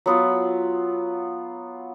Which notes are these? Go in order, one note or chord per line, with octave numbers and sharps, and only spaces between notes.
F#3 B3 F4